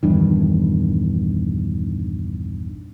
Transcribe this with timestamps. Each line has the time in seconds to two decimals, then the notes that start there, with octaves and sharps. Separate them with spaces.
0.03 A#1 E2 G2 D#3